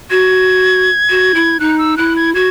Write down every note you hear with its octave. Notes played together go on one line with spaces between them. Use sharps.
F#4 G#6
F#4
E4
D#4 F#6
E6
E4 F#6
G#6
F#4 G#6